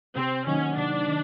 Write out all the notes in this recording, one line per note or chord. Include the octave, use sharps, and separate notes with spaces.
C3 C4
D#3 F#3 A#3 C#4 D#4
C3 D4
D#3